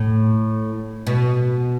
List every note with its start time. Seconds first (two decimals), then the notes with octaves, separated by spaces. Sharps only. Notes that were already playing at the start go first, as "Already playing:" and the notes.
Already playing: A2
1.07 B2